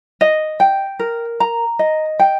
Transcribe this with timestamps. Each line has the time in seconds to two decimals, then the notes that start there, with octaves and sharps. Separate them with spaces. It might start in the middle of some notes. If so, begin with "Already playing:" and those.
0.21 D#5
0.60 G5
0.99 A#4
1.40 A#5
1.79 D#5
2.20 G5